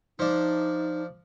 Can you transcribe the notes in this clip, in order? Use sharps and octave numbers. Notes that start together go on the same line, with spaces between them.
F3 D4 D#4